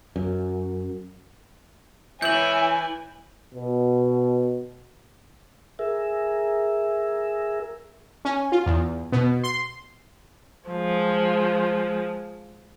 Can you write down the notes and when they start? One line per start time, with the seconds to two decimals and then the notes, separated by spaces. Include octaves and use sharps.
0.16 F#2
2.22 E3 C#5 E5 G#5 G6 F#7
3.54 B2
5.79 G#4 A#4 E5
8.25 C#4
8.52 F4
8.66 E2
9.12 B2
9.44 C6
10.70 F3 G#3